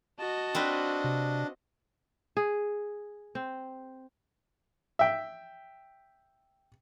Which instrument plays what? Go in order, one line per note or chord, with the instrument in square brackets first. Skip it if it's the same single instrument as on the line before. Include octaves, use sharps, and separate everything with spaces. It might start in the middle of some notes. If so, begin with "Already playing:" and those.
[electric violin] F#4 D#5 [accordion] A5
[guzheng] C4 F4 B4 [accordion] D4
[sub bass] C3
[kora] G#4
C4
[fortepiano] E5 G5